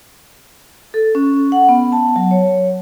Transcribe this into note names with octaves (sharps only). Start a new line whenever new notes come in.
A4
C#4
F#5
B3
A5
F#3
C#5